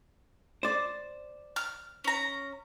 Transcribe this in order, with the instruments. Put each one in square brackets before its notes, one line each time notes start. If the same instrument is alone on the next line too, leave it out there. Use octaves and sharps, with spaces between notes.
[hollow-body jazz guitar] C5 D5
[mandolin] F6
C#4 A#5